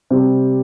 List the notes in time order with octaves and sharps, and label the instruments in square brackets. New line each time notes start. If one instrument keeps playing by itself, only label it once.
[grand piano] C3 G3 C4